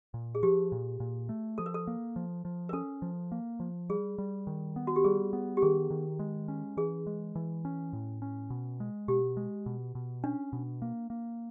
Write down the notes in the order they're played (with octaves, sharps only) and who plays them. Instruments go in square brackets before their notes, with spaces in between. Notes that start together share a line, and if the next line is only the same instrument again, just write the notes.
[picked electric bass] A#2
[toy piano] G#4
[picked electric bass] F3 [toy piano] G4
[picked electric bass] A#2
A#2
A3
[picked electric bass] F3 [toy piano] A4
[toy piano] A#4
A4
[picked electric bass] A#3
F3
F3
[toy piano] A#4
[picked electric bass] C#4 [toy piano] A4
[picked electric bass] F3
A#3
F3
[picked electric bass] G3 [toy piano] G#4
[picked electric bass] G3
D#3
B3
[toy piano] F#4
G4
[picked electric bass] G3 [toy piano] G#4
[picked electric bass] B3
[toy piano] G4
[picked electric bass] D#3 [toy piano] G#4
[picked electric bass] D#3
G#3
C#4
[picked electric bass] E3 [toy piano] G#4
[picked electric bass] G#3
E3
C#4
A2
C#4
B2
G#3
[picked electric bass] B2 [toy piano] G4
[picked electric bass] G#3
B2
B2
[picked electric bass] C#4 [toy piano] D4
[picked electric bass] B2
A#3
A#3